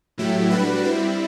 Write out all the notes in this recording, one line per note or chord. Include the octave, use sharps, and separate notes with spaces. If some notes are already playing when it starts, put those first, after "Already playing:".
A2 F#3 A3 E4 G4
G3 D4 F#4 B4
G3 C4 E4